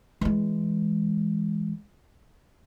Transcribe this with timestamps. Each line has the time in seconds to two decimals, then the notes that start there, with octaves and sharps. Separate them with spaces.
0.21 E3 G#3